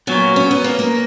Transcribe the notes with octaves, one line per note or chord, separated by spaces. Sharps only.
A#2 F#3 B3 C#4
C#4
B3
A#3
A#3